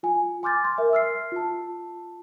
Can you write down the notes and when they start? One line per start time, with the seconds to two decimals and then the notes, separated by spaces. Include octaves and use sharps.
0.03 F4 G#5
0.43 G#5 C6 D6 F6 G6 A6
0.64 C6
0.78 A#4 E5
0.93 E6 F6 C7
1.32 F4 A5